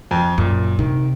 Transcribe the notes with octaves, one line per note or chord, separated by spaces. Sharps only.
F2
F#2 A#2
C3 D#3